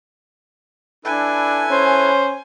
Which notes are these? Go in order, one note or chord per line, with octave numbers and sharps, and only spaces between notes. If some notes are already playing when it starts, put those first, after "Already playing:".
D4 E4 A4 B4 G#5
C#4 C5